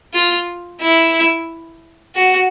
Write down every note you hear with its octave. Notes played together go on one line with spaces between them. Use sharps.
F4
E4
F#4